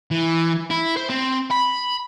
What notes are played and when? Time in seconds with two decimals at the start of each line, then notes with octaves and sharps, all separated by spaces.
0.11 E3
0.70 E4
0.97 C5
1.09 C4
1.51 B5